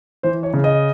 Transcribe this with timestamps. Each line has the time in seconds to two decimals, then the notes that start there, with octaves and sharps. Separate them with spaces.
0.23 E3 C5
0.43 C#5
0.54 C#3
0.64 D#5